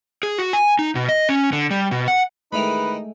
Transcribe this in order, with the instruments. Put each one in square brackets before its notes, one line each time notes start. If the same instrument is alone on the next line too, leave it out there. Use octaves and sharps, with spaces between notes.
[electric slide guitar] G#4
F#4
G#5
D#4
B2
D#5
C#4
D3
G3
B2
F#5
[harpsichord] D#3 E3 B5 [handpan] G#3 A3 [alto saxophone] D#4 [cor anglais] B4